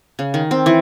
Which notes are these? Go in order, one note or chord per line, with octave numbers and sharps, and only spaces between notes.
C#3
D#3
C4
E3